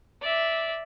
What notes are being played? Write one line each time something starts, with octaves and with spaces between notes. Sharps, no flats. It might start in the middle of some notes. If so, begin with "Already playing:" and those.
D5 E5